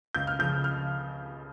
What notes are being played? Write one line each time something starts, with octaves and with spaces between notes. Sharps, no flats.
C#2 G6
F6
C#3 F3 G6
F6